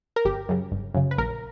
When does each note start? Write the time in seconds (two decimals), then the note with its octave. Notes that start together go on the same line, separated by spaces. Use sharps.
0.16 A#4
0.25 G1 G4
0.49 F#2 C#3
0.72 G1
0.94 F#2 C#3
1.11 B4
1.18 A#1 A#4